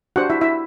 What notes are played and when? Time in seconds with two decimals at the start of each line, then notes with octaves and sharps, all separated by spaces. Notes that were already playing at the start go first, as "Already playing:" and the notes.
0.16 D4 F#4 G4 C5 F#5
0.30 E4 E5
0.41 E4 E5